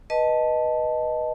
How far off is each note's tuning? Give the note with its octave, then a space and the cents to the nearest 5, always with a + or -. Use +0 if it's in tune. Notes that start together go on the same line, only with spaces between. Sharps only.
B4 -20 D#5 +0 A5 +0